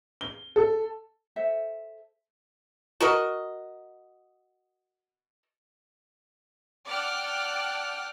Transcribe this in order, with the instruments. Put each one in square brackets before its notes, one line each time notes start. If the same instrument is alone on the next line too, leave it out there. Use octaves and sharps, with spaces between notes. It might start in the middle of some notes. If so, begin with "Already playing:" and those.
[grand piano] G7
A4
[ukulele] A4 C5 E5
[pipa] F#4 A#4 D#5
[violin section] D5 F#5 G5 A5 F6 F#6